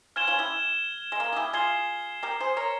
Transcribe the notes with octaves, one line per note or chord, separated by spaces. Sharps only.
C#4 F4 F6 G#6 E7 G7
C#4 F4
E4 G4
G#3
A#3
G#4
E4 G4
F4 G#4 G#6 C7 G7
G4 A#4
G#4 C5
A#4 C#5